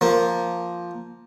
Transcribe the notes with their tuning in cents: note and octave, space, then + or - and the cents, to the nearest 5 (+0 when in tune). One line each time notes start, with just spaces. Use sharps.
F3 +0 A#3 +0